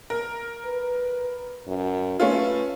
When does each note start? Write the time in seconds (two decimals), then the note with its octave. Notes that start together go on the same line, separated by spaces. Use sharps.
0.10 A#4
0.65 B4
1.67 F#2
2.20 A3 C#4 F4 B4